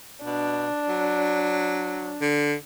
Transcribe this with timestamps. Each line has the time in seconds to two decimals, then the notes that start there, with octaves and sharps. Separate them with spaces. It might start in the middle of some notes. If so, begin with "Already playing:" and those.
0.24 B2 D4
0.89 F#3
2.21 D3